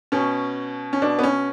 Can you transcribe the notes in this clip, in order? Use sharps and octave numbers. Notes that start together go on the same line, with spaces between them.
B2 C#4
C#4
B2 D4
B3
C#4